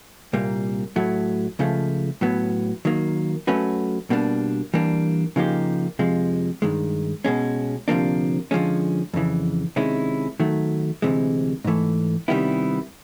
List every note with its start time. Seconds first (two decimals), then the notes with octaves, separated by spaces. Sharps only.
0.33 C2 A#2 G3 A#3
0.96 A2 F#3 A3
1.59 C#2 C#3 F3 A3
2.21 A2 F#3 B3
2.85 D#3 F#3 A#3
3.47 F#3 A3 C#4 F#4 B4
4.10 B2 G3 A#3 D4
4.74 E3 G3 A#3 D4
5.36 C#3 F3 A#3 D#4 G4
5.99 F2 C3 F3 G#3
6.62 G2 D#3 G#3
7.25 B2 G#3 C#4
7.88 D2 C3 F3 A#3 D4
8.51 D3 F3 G#3 C#4
9.14 F2 C#3 E3
9.76 C3 D#3 G#3 C#4 E4
10.40 D#3 F#3 A3
11.02 D2 C3 E3 G#3
11.64 G#2 E3 A3
12.28 C3 D#3 G3 B3 E4